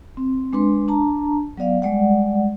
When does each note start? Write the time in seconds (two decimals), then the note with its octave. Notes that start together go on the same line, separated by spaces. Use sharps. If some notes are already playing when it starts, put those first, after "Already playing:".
0.17 C4
0.53 G#3 D4 B4 C6
0.88 D4 A5 A#5
1.57 F#3 B3 D5 F5
1.82 G3 G#3 D5 F#5